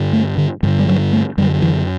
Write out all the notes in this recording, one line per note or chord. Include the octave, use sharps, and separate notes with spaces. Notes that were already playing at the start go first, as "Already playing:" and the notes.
Already playing: G2 D3
A3
D3
G2 D3 E3
G3
F#3
A3
F#2 D3 G3
E3